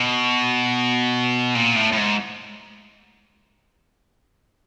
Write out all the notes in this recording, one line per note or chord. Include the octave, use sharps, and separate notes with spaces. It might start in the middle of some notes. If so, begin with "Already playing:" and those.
Already playing: B2
A#2
A2
A2
G#2